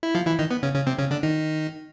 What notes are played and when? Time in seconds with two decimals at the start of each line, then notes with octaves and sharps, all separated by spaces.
0.03 E4
0.15 F3 F4
0.26 E3 E4
0.39 D#3 D#4
0.51 B3
0.63 C#3 C#4
0.75 C#3 C#4
0.87 C3 C4
0.99 C#3 C#4
1.11 D3 D4
1.23 D#3 D#4